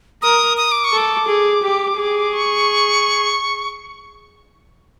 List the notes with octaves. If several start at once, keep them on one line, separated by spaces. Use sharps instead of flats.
A#4 D#6
D#6
D6
C#6
A4 D6
G#4
G4
G#4
C#6